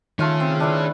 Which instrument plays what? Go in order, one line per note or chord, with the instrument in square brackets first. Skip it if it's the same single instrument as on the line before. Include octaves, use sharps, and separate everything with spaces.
[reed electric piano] D#3 [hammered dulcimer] A3 F4 C#6 [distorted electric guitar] G#4 C#5
[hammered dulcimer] C4
D4 E4 B4